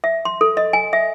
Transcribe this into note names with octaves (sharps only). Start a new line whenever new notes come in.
E5
C6
A4
D#5
G#5
E5